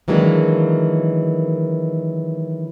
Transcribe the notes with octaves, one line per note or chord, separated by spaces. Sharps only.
D#3 E3 F#3 G#3 A#3 D4